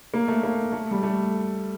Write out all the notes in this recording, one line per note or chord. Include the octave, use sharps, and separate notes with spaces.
A#3
A3
A#3
A3
G3
A3